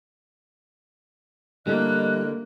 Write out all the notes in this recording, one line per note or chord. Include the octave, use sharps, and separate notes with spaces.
D3 G3 A3 A#3 E4 D#5 F#6